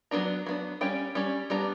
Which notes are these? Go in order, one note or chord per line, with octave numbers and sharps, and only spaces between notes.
F#3 B3 D4 A#5
F#3 B3 D4
G3 C#4 G5
G3 C#4
G3 B3 D4 A#5